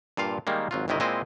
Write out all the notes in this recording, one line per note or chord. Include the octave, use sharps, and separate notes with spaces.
G2 A#2 F4 F5
D#3 G3 G#3 A#3
G#1 F#3 F4
G1 C2 C3 D#3 E4 D#5
A#2 G#3 C4 E4 D#5